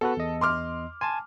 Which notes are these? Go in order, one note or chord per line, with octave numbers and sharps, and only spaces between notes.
B3 F#4 A4 B4
E2 D#5
C6 D6 F6
G#5 A5 C6